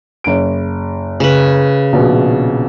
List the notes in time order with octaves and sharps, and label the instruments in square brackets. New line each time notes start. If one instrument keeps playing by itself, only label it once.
[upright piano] F#1 D7
[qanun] C#3 B4
[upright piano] A#1 B2